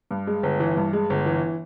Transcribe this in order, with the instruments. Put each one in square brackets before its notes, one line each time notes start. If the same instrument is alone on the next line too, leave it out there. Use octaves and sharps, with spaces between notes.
[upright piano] G2
G#3
G1
E3
G2
G#3
G1
E3